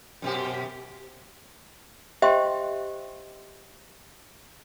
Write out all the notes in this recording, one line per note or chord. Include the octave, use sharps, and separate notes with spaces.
F#2 B2 G4
G4 C5 D#5 E5 G5 C6